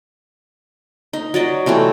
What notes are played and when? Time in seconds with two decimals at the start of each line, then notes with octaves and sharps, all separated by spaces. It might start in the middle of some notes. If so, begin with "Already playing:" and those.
1.13 D#4
1.34 F#3 D5 D#5
1.66 C3 E3 A3 C4